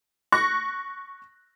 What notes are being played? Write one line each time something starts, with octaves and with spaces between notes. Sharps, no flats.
C#6 F#6 A#6